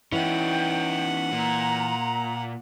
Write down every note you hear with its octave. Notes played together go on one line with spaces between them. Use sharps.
E3 C#4 D#4 E4 F#5 G5
A#2 A#5